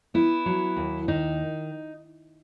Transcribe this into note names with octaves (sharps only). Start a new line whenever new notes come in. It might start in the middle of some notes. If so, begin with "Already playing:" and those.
B3 E4
F#3
D#2
D#3 D#4